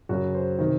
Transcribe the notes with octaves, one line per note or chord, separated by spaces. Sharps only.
F#2 C#3 F#4
C5
C3 D#3